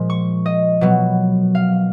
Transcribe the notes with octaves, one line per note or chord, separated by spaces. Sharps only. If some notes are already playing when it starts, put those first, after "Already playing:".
Already playing: A#2 F3 G#3
C#6
D#5
B2 F#3 B3
F5